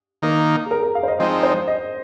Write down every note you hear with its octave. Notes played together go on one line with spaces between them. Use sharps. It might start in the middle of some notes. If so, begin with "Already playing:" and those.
D#3 A#3 D#4 A#4
G#4
A#4
A#4
F5
C5
D#5
F3 G#3 C4 D#4 D#5
C5
D#5